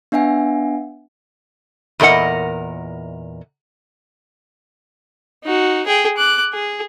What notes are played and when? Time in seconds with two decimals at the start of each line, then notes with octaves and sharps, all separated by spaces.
0.12 B3 D4 E5 F#5 G#5
2.00 E2 A#2 A#4 D#5 F#5
5.44 D#4 F#4
5.87 G#4 G5
6.17 D6 F#6
6.53 G#4